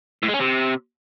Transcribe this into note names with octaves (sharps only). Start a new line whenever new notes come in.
A2
G#3
C#4
C3